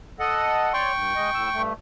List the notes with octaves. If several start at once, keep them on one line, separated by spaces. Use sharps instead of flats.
A4 D#5 F#5
C#5 D5 G5 C6 C#6
G2
G#3 D#5
A2 E6
G2 A3